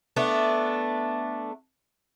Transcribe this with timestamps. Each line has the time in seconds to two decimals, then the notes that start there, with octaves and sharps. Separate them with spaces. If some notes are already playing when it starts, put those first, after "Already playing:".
0.16 A3 B3 D4